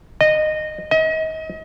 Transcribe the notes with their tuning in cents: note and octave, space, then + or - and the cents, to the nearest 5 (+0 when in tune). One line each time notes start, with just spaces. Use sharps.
D#5 -15
D#5 +35